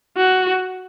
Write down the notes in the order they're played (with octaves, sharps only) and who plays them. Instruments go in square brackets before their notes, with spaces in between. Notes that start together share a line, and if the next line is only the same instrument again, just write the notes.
[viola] F#4